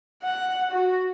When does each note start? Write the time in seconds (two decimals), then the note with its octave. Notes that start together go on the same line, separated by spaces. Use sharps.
0.23 F#5
0.71 F#4